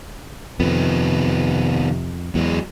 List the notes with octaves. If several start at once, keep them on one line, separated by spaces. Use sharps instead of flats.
F2 C3 D#3 B3
E2 F#3 G#3